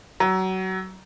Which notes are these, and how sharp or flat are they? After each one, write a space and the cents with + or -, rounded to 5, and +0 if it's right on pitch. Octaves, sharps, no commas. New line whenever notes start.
F#3 +25